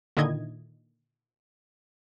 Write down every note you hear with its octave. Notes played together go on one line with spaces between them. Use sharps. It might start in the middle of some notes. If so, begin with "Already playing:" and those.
A#2 D3 D#3 E4 D#5 G#6